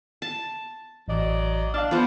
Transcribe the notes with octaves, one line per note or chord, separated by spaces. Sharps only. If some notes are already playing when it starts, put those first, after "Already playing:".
A5
A1 F#3 D5 D#5
D4 F5 A5 D6 F6
F3 B3 C5